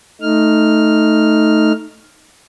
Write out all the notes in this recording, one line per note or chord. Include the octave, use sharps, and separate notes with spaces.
A3 D#4 F6